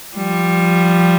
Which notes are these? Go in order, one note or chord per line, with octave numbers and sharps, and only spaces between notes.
F3 G3